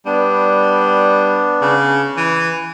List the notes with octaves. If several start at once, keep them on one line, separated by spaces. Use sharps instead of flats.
G3 B3 D4
C#3
E3